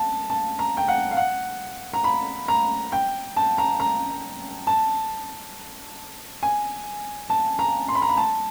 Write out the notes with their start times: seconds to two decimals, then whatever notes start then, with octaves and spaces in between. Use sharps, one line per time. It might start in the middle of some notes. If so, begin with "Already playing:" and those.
Already playing: A5
0.30 A5
0.59 A#5
0.77 G5
0.88 F#5
1.11 F5
1.17 F#5
1.93 A#5
2.04 B5
2.48 A#5
2.92 G5
3.36 A5
3.58 A#5
3.80 A#5
4.67 A5
6.43 G#5
7.30 A5
7.59 A#5
7.88 C6
7.95 B5
8.02 A#5
8.09 B5
8.17 A5